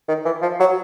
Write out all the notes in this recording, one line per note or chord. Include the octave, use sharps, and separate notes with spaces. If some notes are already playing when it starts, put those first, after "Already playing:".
D#3
E3
F3
F#3